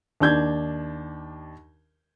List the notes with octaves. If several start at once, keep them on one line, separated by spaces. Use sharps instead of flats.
D#2 D4 G6 G#6